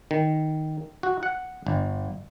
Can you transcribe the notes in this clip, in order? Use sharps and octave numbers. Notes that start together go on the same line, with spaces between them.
D#3
F#4
F#5
G1